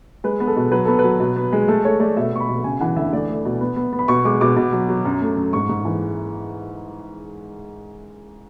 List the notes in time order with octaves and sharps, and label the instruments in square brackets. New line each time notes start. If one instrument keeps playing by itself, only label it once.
[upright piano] G#3 B4
B3
A4
B2
F#3 B4
B3 A4
B4
F#3
B2
B3
G#3
A3 A4
A3 C#5
A3 D5
B2 E5
B2 C#6
B5
B2
C#3 G#5
E3 F#5
D2 E5
A3 D5
A3
B2
B3
B3
B3
B5
B2 C#6
G#3 D6
B2 D6
B2
F#3
F#3
F#2
A3
F#2
G#2 C#6
G#2
E3